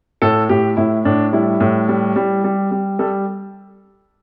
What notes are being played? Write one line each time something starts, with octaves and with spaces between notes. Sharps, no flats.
A2 A4
A2 G4
A2 E4
A2 D4
G3 E4
A2
G3
G3
G3
G3
G3 A4